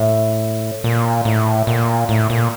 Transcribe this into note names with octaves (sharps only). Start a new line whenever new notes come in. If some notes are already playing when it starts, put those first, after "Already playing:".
Already playing: A2
A#2
A2
A#2
A2
A#2